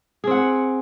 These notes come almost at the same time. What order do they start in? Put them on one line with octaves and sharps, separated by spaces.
G#4 C4 F#5